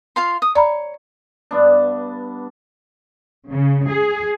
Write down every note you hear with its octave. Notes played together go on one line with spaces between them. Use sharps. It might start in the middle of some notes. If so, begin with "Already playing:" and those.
F4 F5 C6
D#6
C#5 D5 A#5 B5
G2 B3 D4
C#3
G#4